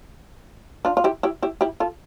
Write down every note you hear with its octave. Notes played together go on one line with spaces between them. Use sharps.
D4 F4
F4
E4 G4
E4 G4
E4 G4
E4 G4
F4 A4